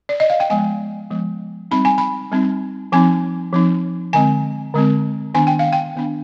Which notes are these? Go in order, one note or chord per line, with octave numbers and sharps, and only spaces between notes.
D5
D#5
F5
G5
F3 G#3 B3 G#5
F3 G#3 B3
G3 C4 D#4 B5
G#5
B5
G3 C4 D#4
F3 C4 D#4 G#5
F3 C4 D#4
D3 G#3 C4 G#5
D3 G#3 C4
D#3 B3 D4 G#5
G5
F5
G5
D#3 B3 D4